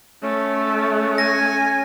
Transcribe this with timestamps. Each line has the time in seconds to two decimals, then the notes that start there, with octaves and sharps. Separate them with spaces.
0.23 A3 C#4
1.18 G#5 A#6